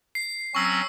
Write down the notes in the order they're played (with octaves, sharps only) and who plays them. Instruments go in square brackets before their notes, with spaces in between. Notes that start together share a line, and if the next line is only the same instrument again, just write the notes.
[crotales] C7
[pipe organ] F#3 C4 C#4 [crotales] C#6 E6 C7